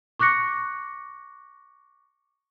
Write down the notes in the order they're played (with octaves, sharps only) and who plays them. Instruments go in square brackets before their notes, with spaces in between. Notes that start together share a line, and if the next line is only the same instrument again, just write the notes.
[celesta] C#6 D6 F#6 A#6 C#7